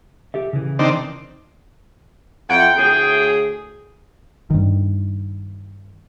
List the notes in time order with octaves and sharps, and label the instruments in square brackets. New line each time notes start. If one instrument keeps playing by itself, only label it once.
[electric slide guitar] G4 A4 E5
C#3 E3
[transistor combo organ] D#3 C4 D4
[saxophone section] F2 E4 F#5 [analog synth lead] G5
[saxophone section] D2 A2 G#4
[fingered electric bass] G2 D#3